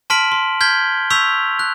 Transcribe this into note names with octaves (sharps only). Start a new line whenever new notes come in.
A5 C6 F6 B6 D7 F#7
C6
F6 G6 G#6 B6 G7
C#6 E6 G6 B6 F7
F#6